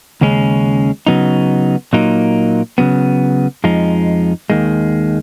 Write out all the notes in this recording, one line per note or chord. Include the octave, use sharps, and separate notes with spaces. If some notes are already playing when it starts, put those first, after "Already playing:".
D#2 C#3 G#3 C#4
C#3 F#3 B3 D#4
A#2 F#3 A#3 D#4
C#3 F#3 B3
F2 F3 G#3 D#4
D#2 D#3 G#3